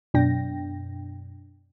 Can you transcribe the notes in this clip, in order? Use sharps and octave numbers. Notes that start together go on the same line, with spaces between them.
F#2 B2 D4 G5 A#6